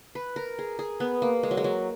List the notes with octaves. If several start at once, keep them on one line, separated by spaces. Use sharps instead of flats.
B4
A#4
G#4
G#4
B3
A#3
G#3
F#3
G#3
F#3